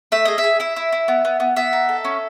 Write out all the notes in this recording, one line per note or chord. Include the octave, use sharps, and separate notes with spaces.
A3 E5
G#4 D#5
E5
G#4
E4 E5
E4
E4
B3
B3
B3
B3 E5
D#4
A4
C#4